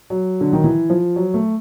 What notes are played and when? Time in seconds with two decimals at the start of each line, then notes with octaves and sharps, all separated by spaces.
0.10 F#3
0.41 D3
0.53 D#3
0.64 E3
0.89 F3
1.16 F#3
1.34 A3